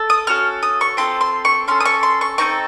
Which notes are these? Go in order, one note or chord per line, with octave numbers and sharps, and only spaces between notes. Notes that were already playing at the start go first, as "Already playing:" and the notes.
Already playing: A4
D#6
C#4 F#4 A4 F6
D#6
C#6
C4 F4 A4 C6
C6
C#6
C#4 A4 C6
D#6
C#6
C6
C#6
C4 D#4 A4 C#6